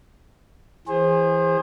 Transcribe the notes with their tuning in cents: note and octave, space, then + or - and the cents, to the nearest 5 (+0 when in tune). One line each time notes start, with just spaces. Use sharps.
E3 +0 G#4 -25 C5 +25